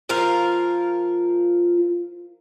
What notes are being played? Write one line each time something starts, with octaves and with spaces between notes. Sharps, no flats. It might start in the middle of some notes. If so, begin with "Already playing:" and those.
F3 F4 A#4 F5